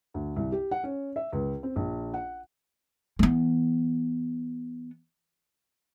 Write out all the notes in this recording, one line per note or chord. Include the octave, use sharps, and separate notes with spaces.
D2
C2
G4
F#5
C#4
E5
C#2
C4
A#1
F#5
E3 B3